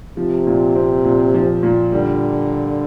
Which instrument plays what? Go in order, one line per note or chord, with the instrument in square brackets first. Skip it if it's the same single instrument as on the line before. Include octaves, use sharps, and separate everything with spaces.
[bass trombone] C3 [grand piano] F3
[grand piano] A#2
C4
A#2
F3
A#2
[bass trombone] D3 [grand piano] G3